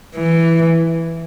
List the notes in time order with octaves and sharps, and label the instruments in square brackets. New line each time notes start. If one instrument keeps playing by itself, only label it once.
[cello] E3